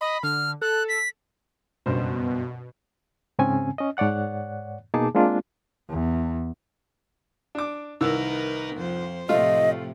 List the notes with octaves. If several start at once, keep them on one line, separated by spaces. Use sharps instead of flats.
D#5 B5
D3 F6
A4 F#6
B6
F#1 G2 B2 C5
G#2 C#3 C4 C#4 G#5
C#4 D#5
G#2 C#5 D5 F#5 F#6
B2 A#3 D#4 G#4 A5 D6
G#3 A#3 C4 D4 F4
E2
D4 D6
C2 D#3 D#4 A#4 B4 E6
F2 F3 C5
A2 C3 F3 A3 F4 D#5